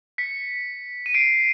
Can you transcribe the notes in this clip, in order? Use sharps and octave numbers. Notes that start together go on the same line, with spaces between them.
B6 C#7
D#7
C7 D7